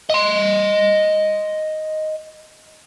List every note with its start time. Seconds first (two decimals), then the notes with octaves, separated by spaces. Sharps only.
0.10 D#5 C6